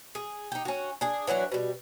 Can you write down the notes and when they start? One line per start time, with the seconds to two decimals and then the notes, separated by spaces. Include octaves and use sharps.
0.15 G#4
0.52 D#4 G4
0.65 C#4 F#4
1.01 D4 G#4
1.27 E3 F#3 D4 F#4
1.52 B2 G3